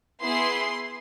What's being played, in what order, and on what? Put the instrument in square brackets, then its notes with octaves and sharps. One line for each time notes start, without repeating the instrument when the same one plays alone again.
[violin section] B3 E4 G#4 C6